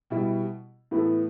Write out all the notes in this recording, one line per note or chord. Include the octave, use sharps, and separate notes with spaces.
B2 G3 E4
A2 E3 B3 E4 A4